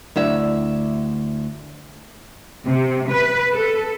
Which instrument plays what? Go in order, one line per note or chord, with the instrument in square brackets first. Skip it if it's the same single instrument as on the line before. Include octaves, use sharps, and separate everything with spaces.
[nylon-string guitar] D2 E4 E5
[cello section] C3
B4
A4